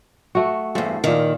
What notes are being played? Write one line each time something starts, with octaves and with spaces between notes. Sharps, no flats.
A3 F#4
E2 G2 A4 C5
A#2 D#3 F5